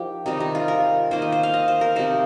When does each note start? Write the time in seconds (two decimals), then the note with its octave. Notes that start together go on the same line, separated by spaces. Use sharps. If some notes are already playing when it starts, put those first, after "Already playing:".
Already playing: F3 D#4 G4 A#4
0.26 C3 D#3 G3 D#4
0.40 D#4
0.55 F4
0.68 A#4
1.11 D#3 A#3 D#4 C5
1.22 D#5
1.32 C5
1.43 F5
1.54 D#5
1.68 C5
1.81 A#4
1.96 C3 F3 A#3 D#4 C5